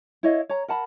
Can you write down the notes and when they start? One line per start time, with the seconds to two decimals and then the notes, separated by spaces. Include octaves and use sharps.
0.23 E4 C#5 D#5 F5
0.49 C#5 A#5
0.68 A#4 F#5 A5 B5